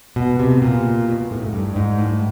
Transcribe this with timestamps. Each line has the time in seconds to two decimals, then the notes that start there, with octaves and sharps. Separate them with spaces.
0.16 B2
0.40 C3
0.62 A#2
1.09 B2
1.21 A#2
1.31 A2
1.42 G#2
1.53 G2
1.68 A2
1.76 G#2
1.98 A2